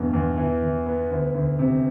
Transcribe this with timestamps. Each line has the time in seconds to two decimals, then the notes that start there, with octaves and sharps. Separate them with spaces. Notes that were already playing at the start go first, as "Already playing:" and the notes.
Already playing: E2 G2 B2
0.13 E2
0.38 E3
0.62 E3
0.86 B3
1.11 D2
1.35 D2
1.59 C3